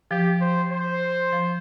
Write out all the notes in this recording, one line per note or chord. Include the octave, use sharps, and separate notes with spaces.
F3 G4
C5
C5
F3